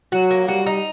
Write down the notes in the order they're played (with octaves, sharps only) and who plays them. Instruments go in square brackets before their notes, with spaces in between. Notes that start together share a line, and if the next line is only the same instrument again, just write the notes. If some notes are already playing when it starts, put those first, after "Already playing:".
[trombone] F#3 [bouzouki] F#4
[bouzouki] A#3
[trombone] G3 [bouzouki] F#4
[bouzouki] D#4